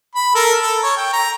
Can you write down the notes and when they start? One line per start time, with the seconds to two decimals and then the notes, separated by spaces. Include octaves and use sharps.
0.15 B5
0.35 A4 A#4
0.61 A4
0.83 C#5
0.97 G5
1.13 A#5